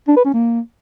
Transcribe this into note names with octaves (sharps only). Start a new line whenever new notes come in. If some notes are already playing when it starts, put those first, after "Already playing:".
D4
B4
C#4
A#3